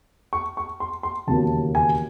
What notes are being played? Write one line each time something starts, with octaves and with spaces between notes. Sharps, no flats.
C#6
C#6
C6
C6
E1 D#2 C#3 F#3 A#3 A5
G#5